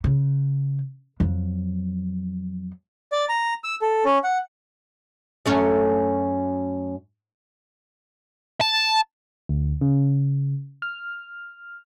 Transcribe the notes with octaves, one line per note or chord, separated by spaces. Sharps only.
C#3
F2 F#3
D5
A#5
E6
A4
C#4
F#5
F#2 A3 C#4
A5
D2
C#3
F6